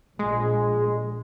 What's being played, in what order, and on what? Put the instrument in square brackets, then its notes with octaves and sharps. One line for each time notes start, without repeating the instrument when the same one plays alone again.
[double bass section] A#1 [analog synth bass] G#3